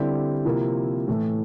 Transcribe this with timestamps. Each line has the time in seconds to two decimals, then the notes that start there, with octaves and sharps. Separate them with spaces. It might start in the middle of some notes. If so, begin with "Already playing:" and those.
Already playing: D3 G3 C4 E4 G4
0.45 C3 F3 A#3 E4
1.08 A2 E3 A3